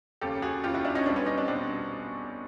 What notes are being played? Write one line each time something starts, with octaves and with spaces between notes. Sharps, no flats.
F1 D#2 C#3 G4 A4
F#4 G#4
F1 D#2 C#3 F4 G4
E4 F#4
D4 E4
C#4 D#4
B1 B2 G3 C4 D4
B3 C#4
C#4 D#4
C4 D4
B2 G3 C4 D4